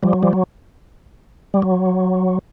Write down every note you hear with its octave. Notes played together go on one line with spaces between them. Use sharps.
F3 G3
F#3
F3 G3
F#3
G3
F#3